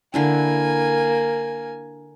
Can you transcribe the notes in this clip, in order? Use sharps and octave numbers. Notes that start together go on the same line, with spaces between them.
D3 A#3 D4 E4 G#5